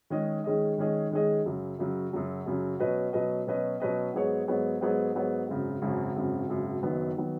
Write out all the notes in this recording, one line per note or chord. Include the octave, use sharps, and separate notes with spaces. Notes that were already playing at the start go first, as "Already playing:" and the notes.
D#3 G#3 C#4 G#4 D#5
D#3 G#3 C#4 G#4 D#5
D#3 G#3 C#4 G#4 D#5
D#3 G#3 C#4 G#4 D#5
F#2 C#3 F#3
F#2 C#3 F#3
F#2 C#3 F#3
F#2 C#3 F#3
B2 F#3 C#4 B4 D#5
B2 F#3 C#4 B4 D#5
B2 F#3 C#4 B4 D#5
B2 F#3 C#4 B4 D#5
G#2 F#3 B3 G#4 C#5
G#2 F#3 B3 G#4 C#5
G#2 F#3 B3 G#4 C#5
G#2 F#3 B3 G#4 C#5
G#1 F#2 C#3
G#1 F#2 C#3
G#1 F#2 C#3
G#1 F#2 C#3
F#1 F#2 D#3 F#3 B3
D#3 F#3 B3